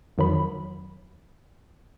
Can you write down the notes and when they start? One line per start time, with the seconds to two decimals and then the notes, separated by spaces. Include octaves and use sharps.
0.18 F2 D#3 F#3 B5